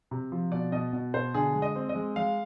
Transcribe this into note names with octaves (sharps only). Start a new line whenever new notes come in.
C3
F3
B2 D5
B2 D#5
B2
B2 C5
D3 G#4
G#3
D#5
C4
D#5
G#3
G#3 F5